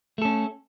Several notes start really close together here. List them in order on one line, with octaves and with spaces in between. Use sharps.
A3 A4 C#4